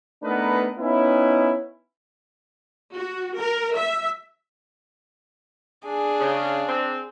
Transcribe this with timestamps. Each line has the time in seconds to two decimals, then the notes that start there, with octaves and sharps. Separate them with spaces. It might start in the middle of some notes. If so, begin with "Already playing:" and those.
0.23 A3 B3 D4 D#4 A#4 B4
0.78 B3 C#4 D#4 E4
2.96 F#4
3.38 A#4
3.77 E5
5.86 D4 G#4
6.20 C#3
6.68 C4